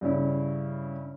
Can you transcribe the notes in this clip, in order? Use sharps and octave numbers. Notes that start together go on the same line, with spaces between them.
G2 C#3 C#4 E4